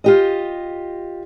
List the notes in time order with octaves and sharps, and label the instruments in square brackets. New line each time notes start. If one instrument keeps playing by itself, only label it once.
[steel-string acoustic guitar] F4 G4 D#5